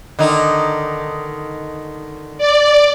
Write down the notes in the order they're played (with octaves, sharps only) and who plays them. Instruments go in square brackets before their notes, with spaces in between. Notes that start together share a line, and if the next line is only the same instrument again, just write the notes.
[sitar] D3 D#3 D#4
[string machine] D5